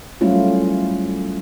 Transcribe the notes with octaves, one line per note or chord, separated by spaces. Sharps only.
F#3 G3 A3 C#4 E4 F4